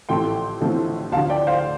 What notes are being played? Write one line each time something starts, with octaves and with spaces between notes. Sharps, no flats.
A1 A2 F3 A3 C4 G5 C6
A1 A2 F3 A3 C4
D2 D3 F3 F5 A5
D5 G5
C5 F5